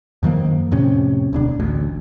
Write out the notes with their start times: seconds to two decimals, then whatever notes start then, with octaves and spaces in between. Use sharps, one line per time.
0.23 F#2 D#3 F3 A#3
0.71 F2 A2 C3 C#4
1.33 D1 B2 D4
1.60 A1 D2